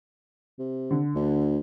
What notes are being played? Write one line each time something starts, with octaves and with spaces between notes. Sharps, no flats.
C3
D3
D2